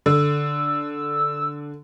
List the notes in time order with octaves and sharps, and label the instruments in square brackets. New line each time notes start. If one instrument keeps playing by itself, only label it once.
[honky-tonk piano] D3 [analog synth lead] E6